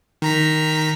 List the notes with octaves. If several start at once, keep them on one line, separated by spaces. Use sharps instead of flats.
D#3 A#5 B6